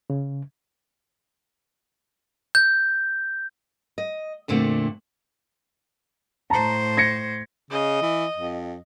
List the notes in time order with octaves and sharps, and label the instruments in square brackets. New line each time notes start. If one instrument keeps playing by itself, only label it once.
[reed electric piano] C#3
[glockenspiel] G6
[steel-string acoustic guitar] D#5
F2 A#2 D3 A3 C4
[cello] A2 C5 [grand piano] A5 A#5
[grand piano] G#6 A#6 C#7
[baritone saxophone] C#3 [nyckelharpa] D#5
[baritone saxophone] E3
F2